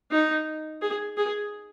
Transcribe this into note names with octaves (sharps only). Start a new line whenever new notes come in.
D#4
G#4
G#4